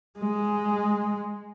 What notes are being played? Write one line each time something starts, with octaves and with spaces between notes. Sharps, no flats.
G#3